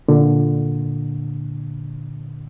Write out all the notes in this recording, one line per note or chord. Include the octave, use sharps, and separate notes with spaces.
A#2 D3